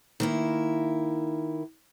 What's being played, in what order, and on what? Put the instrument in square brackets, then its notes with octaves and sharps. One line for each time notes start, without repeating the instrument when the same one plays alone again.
[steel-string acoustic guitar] D#3 A#3 E4